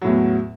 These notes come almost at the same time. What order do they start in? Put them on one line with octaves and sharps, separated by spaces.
F#3 A2 E2